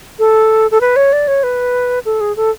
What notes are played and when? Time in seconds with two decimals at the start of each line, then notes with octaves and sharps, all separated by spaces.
0.19 A4
0.71 A4
0.81 B4
0.96 C#5
1.13 D5
1.28 C#5
1.43 B4
2.05 A4
2.21 G#4
2.36 A4